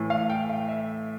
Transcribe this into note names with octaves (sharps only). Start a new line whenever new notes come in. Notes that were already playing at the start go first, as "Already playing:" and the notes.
Already playing: A2 E3
F5
G5
F5
E5